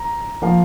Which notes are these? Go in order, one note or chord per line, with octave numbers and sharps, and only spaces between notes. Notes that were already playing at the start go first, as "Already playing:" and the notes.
Already playing: A#5
F3 A#3 F5